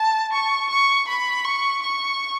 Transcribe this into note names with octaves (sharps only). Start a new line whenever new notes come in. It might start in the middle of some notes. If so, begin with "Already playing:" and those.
Already playing: A5
C#6
C#6
B5
C#6
C#6